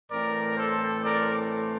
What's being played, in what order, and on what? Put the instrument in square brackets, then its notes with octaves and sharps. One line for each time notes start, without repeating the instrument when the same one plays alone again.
[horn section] A2 E3 A3 C4 A#4 D5
A4 C5
A#4 D5